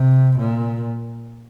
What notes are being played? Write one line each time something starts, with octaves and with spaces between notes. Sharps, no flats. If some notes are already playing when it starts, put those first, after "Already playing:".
Already playing: C3
A#2